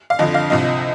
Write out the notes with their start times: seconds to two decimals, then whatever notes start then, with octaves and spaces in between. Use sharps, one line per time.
0.10 F5
0.19 F2 D3 F3 D#5
0.34 F5
0.50 C2 C3 F3 D#5